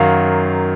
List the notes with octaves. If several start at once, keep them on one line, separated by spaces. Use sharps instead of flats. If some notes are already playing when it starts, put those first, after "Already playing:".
Already playing: F#2 D#3 F#3 F5